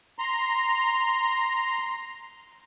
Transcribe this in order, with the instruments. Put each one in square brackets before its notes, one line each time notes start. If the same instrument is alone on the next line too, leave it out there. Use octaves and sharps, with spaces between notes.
[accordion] A#5 C6